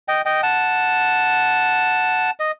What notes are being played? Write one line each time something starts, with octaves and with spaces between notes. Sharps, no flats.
D#5 G5
D#5 G5
F#5 A5
D#5